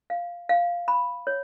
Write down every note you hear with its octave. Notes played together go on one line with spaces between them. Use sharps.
F5
F5
B5
C#5